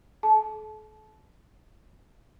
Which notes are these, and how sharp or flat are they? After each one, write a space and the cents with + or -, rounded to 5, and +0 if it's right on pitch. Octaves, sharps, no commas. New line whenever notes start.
A4 -40 A5 -20